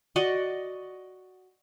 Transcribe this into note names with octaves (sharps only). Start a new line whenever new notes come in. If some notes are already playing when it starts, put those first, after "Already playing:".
F#4 D5 D#5 F#5